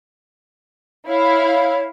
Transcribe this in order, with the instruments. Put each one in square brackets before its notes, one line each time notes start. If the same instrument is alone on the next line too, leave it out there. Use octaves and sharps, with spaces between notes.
[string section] E4 F5 [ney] C#5